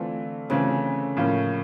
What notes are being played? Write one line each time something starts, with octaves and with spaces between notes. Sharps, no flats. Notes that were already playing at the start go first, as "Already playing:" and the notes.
Already playing: D3 E3 A3 C4 F4
C#3 E3 A3 C4 F4
A2 F3 A#3 C#4